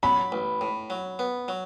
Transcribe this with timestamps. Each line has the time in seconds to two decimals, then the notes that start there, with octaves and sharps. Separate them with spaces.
0.03 F#3 B5
0.32 A1
0.61 A2
0.90 F#3
1.19 B3
1.48 F#3